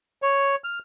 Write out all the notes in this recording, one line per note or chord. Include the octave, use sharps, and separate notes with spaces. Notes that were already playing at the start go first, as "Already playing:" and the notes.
C#5
F6